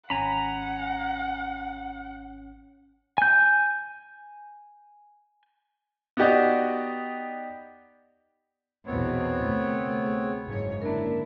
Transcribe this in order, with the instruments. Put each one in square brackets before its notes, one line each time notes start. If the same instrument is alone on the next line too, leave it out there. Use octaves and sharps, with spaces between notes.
[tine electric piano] G#1 C#4 [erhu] F#5 [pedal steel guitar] G#5 A#5 B5
[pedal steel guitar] G#5 G6
[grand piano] B3 D#4 F#4 G4 D5 D#5
[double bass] A#1 E2 [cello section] B2 [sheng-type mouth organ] B3 C4 C#5
[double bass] D2 C3 [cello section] A3
[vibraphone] G#4
[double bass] F#1 C#3 [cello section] G#2 C#5
[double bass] D3 D4 [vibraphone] A#3 C#4 A#4 [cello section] E4